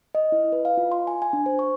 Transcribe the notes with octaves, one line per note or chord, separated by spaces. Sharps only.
D#5
E4
B4
F5
F4
C6
G#5
G#5
D4
C5
C#6